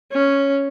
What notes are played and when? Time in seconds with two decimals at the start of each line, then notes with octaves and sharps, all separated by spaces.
0.11 C#4